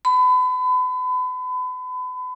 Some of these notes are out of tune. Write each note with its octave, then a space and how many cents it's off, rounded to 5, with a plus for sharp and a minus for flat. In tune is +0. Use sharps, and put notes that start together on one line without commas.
B5 +35